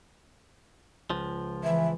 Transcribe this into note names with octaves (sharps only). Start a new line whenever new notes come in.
C#2 F3
E3 E5